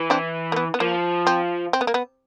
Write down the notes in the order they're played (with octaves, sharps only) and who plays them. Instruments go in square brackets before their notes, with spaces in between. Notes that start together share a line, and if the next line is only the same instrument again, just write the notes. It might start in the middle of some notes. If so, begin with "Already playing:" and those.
Already playing: [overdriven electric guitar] E3
[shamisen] C4 D4
A#3
B3
B3
[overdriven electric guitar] F3 [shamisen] A#3
[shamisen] C4
C4
B3
A#3
B3